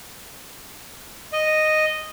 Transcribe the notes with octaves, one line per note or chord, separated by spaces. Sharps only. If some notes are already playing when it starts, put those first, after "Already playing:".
D#5